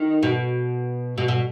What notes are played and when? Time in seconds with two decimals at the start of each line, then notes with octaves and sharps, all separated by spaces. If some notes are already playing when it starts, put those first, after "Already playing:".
Already playing: D#3
0.23 B2
1.18 B2
1.28 B2